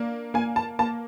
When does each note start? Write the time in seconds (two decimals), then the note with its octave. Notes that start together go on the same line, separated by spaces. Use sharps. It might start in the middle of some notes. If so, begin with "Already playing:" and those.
Already playing: A#3 D4
0.34 A#3 G#5
0.56 A5
0.79 A#3 A5